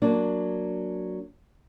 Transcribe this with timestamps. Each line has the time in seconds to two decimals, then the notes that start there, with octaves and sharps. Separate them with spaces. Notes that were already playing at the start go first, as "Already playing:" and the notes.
0.02 F#3 A#3 D4